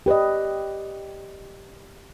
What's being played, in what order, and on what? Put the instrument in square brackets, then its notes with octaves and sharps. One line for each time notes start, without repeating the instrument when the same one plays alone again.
[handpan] G4 B4 D5 D#5